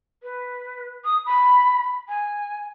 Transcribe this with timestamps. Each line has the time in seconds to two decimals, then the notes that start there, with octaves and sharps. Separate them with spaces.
0.23 B4
1.04 D#6
1.25 B5
2.08 G#5